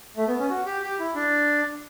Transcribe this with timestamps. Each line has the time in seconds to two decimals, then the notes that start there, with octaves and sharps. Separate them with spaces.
0.17 A3
0.27 B3
0.39 C#4
0.50 F#4
0.66 G4
0.83 G4
0.99 E4
1.15 D4